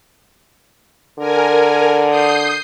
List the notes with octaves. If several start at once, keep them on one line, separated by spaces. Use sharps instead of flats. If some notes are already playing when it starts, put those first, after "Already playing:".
D3 A#4 G#5
D#6 G6 C7